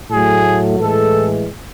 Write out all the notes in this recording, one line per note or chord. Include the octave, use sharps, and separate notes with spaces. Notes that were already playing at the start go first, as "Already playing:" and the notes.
A2 F#3 A3 G#4
A2 E3 G#3 A4